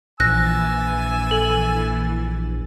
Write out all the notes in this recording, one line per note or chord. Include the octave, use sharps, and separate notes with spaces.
A#1 E3 G#5 E6 F#6 A6 A#6
A4